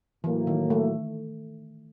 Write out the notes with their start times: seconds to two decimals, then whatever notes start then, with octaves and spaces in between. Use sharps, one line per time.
0.24 A2 E3 F#3 A#3
0.47 D#3
0.70 A3